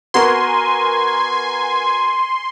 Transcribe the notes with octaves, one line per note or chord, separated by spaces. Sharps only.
B3 F#4 A#4 G#5 C6